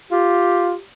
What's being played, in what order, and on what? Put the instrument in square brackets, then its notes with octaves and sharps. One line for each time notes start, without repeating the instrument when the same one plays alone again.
[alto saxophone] F4 [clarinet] G4